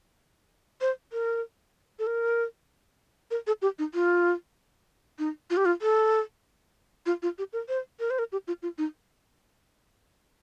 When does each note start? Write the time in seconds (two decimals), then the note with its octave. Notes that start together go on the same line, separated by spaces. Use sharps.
0.81 C5
1.13 A#4
1.99 A4
2.07 A#4
3.31 A#4
3.47 A4
3.62 G4
3.79 D#4
3.94 F4
5.19 D#4
5.50 F4
5.57 G4
5.65 F4
5.82 A4
7.06 F4
7.22 F4
7.38 G4
7.53 A#4
7.68 C5
8.00 A#4
8.10 C5
8.19 A#4
8.32 G4
8.47 F4
8.62 F4
8.78 D#4